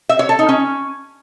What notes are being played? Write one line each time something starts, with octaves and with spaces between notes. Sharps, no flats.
E5
C#5
A4
D#4
C#4